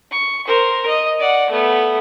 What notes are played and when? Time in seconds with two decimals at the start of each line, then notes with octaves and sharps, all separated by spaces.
0.11 C#6
0.47 A#4 C5
0.87 D#5
1.20 D5 F#5
1.50 A3 B3